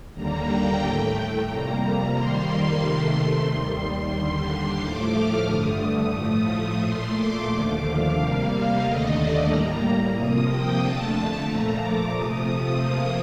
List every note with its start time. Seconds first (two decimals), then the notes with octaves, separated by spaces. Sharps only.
0.13 D#2 D3 G3 A#3 A#5
0.47 G5
0.80 A2 A3
1.47 F2 C3 G3 A#3 A#5
1.80 A#5
2.13 F2 D#3 G3 A#3 C6
2.80 C3 D#3 A3
3.47 D#2 D#3 G3
4.13 D#2 D3 G3
4.80 A2 F3 A3 D6
5.13 F6
5.46 G2 D3 A3 D#6
6.13 A2 F3 A3
6.79 A#2 A3 C6
7.12 D6
7.46 D#2 D3 F3 A3 D6
7.79 F5
8.12 C3 G3 A#3
8.79 D#2 D3 A3 D#5
9.13 D5
9.45 A2 G3 A#3 A#5
10.12 C3 F3 A#3 D#6
10.45 G5
10.79 F2 D3 A3 A5
11.45 A#2 F3 A3 A#5
11.78 D6
12.12 C3 F3 A3 D#6
12.78 C3 F3 A#3